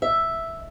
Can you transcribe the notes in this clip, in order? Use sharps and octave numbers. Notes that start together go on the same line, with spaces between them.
E5